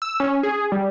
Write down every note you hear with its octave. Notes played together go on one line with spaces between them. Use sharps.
E6
C#4
G#4
G3